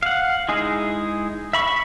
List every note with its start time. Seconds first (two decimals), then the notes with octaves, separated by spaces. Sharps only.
0.03 F5 F#5
0.49 G#3 D#4 E4 G#4
1.53 E5 B5 C#6